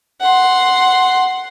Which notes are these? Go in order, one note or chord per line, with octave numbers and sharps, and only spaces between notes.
F#5 C6